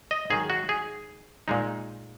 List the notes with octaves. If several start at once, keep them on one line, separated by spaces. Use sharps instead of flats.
D#5
G#2 D#3 F#3 G#4
F#4
G#4
A#2 G#3 D#4